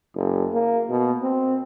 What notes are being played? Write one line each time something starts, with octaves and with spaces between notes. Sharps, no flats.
F#1
A#3
B2
C4